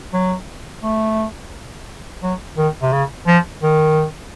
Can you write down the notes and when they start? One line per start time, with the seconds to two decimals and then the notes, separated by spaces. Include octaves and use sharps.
0.13 F#3
0.83 A3
2.23 F#3
2.57 D#3
2.82 C3
2.92 C#3
3.27 F3
3.63 D#3